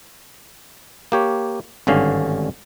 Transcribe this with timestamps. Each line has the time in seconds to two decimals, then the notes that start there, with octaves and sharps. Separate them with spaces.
1.12 A#3 G4 C#5
1.87 G#1 G2 D3 C#4 F5